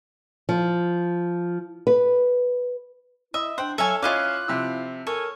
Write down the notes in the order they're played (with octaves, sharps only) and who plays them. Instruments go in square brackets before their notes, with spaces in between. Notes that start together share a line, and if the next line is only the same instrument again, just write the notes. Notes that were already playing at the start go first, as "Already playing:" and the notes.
[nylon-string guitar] F3
B4
[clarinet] E4 [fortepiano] D#5 [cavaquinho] E5
[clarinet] D4 [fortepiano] C5 G5 [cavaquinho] F#5
[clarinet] F#3 [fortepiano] A4 C#5 [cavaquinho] E5 F5 G#5
[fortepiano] C#4 E4 C#5 [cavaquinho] F4 D#5 D6 [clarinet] F5 [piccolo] F#6
[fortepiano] C3 F3 E6 [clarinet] E4
[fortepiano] A4 [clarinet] A#4 [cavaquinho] C#5 [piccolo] G#5